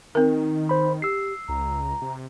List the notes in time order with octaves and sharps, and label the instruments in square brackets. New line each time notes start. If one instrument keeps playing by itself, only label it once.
[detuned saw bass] D#3 [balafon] C4 A#4 [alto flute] D#4
[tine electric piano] C5 B5
[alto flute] G4 [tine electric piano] E6 C7
[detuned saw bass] C#2 [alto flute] A#5
[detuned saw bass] C3